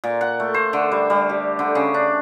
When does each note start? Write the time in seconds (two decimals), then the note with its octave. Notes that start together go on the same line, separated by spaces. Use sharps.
0.04 A#2
0.21 F#5
0.40 A3
0.54 C5
0.73 D3
0.92 G3
1.10 G3
1.29 G4
1.59 D3
1.75 C#3
1.94 D4